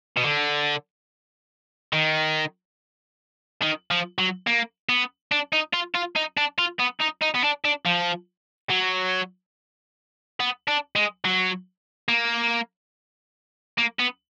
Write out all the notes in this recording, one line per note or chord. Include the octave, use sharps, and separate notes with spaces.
B2
D3
D#3
D#3
F3
F#3
A#3
B3
D4
D#4
F4
F4
D#4
D4
F4
B3
D#4
D#4
B3
D4
D4
F3
F#3
B3
D4
G#3
F#3
A#3
A#3
B3